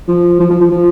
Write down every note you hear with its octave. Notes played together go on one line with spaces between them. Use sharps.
F3
F3
F3
F3
F3